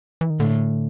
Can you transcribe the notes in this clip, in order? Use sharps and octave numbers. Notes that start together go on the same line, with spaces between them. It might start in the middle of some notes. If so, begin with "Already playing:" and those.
E3
D#3
A2 D3